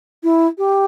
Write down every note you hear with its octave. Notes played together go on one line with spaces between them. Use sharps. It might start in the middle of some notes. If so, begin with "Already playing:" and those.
E4
G4